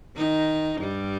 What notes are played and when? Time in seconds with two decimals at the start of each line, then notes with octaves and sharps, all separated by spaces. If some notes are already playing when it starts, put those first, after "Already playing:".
0.17 D#3 D#4
0.81 G2 G3